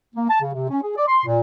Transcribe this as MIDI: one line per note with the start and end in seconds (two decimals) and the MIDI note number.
0.15 0.26 58
0.29 0.38 81
0.41 0.52 49
0.54 0.67 48
0.70 0.80 61
0.82 0.95 68
0.96 1.04 74
1.07 1.25 84
1.25 1.40 46